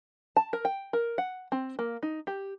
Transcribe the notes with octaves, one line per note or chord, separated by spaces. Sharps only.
A5
A#4
G5
A#4
F#5
C4
A#3
D#4
G4